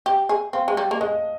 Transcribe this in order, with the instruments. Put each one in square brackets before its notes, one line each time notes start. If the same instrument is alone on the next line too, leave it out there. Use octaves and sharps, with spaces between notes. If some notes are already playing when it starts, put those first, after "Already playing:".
[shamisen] G4 [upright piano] G5
[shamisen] G#4
[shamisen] C4 [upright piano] F5
[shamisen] G#3
G3
A#3
[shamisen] G#3 [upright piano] D#5